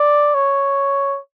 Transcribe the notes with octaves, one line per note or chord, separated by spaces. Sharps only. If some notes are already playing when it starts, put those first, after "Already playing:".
Already playing: D5
C#5